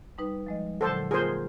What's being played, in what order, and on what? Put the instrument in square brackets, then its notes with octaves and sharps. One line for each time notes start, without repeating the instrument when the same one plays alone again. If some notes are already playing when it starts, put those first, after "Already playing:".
[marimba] G3 D#4 B4
F3 G#3 D#5
[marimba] A#2 D3 F#3 [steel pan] A4 C5 A5
[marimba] A#3 F4 A#4 [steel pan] G#4 C5